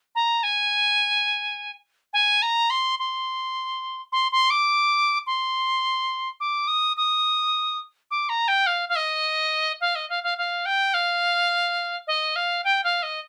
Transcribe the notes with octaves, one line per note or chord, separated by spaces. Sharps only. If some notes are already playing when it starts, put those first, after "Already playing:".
A#5
G#5
G#5
A#5
C6
C6
C6
C6
D6
C6
D6
D#6
D#6
D6
A#5
G5
F5
F5
D#5
F5
D#5
F5
F5
F5
G5
F5
D#5
F5
G5
F5
D#5